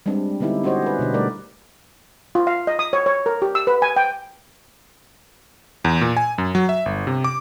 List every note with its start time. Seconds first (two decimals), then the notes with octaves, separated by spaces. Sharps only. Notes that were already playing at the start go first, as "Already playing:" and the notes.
0.06 G3 G#3 C4 D4
0.40 D3 B3 D#4 E4 G4
0.63 C#4 F#4 G4 C5 C#5 D#5
0.82 G#4 B4
0.99 B2 D3 D4
1.14 G3 A3 A#4 D5
2.35 F4
2.47 F5
2.67 D#5
2.79 D#6
2.93 C#5
3.06 C#5
3.26 A#4
3.42 G4
3.55 E6
3.67 B4
3.82 G#5
3.96 G5
5.85 E2
6.01 A#2
6.17 G#5
6.38 F#2
6.55 F#3
6.69 E5
6.86 G1
7.07 C3
7.24 D6